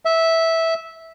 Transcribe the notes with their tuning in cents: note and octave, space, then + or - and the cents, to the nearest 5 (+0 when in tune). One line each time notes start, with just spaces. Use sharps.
E5 -10